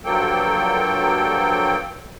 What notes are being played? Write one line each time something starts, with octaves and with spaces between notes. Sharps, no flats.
G2 F3 F#3 A#3 A4 G5